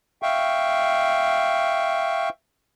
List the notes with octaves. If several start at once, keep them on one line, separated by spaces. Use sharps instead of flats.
E5 F5 G5 C#6